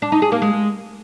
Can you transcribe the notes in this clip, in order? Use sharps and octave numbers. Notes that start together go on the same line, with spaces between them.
D4
D#4
G#4
A#3
G#3